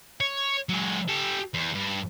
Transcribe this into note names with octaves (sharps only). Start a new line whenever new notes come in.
C#5
F#3 G#3
G4 A4
E2
G2